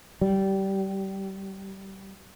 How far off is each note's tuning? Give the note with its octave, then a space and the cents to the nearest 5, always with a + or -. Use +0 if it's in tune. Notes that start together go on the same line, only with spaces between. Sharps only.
G3 -20